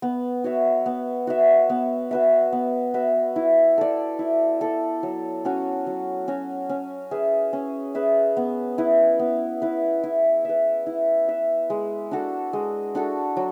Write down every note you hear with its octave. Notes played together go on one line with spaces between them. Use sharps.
B3
F#4 C#5 E5
B3
F#4 C#5 E5
B3
F#4 B4 E5
B3
F#4 B4 E5
E4
A4 D5
E4
A4 D5
F#3
C#4 F#4
F#3
C#4 F#4
C#4
G#4 B4 E5
C#4
G#4 B4 E5
B3
E4 B4
B3
E4 B4
E4
B4 E5
E4
B4 E5
G#3
D4 F#4 A4
G#3
D4 F#4 A4
F#3